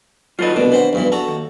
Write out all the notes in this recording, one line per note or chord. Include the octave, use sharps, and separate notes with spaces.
F#3 D#4 F4 A4 B4
C2 B2 D4
E3 C5 F#5
B1 G2 E3
F#4 A4 A#5
D#2